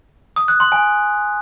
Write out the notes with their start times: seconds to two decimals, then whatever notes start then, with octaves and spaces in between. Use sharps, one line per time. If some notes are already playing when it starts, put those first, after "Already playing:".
0.36 D#6
0.48 F#6
0.60 C6
0.72 G#5